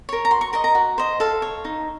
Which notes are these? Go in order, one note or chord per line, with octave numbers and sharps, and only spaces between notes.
A#4 C#5
A#5
F#4 C6
C#6
A#4 D#5 A#5
A#5
F#4
C5 D#5
A4 F5
C#5
D#4